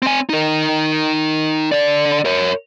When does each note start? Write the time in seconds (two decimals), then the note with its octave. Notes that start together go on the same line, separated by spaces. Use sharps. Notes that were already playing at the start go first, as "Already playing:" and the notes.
0.02 C4 G#5
0.29 D#4 A#4
1.72 D3 D5
2.25 A#4 C#5